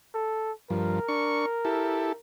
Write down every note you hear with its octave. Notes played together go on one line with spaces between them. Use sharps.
A4
G2 F3 A#4
D4 C#6
E4 G4 A4